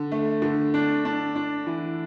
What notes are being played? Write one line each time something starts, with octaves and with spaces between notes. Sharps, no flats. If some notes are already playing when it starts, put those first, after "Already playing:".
Already playing: D3
A3
D3
D4
D4
D4
E3